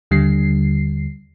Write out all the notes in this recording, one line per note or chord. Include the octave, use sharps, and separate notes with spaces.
D#2 D3 G3 C7